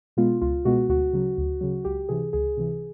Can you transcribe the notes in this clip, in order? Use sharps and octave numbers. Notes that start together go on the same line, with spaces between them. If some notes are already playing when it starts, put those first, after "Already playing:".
B2 G#3 B3 F4
C#2 F4
B2 G#3 B3 F#4
D2 F#4
C#3 F#3
D2
C#3 F#3
C#2 G4
C3 E3 G#4
C#2 G#4
C3 E3